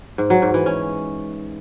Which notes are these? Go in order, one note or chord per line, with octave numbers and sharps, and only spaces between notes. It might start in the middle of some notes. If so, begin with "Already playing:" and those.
G#2
F#3
G#2
E3
C#4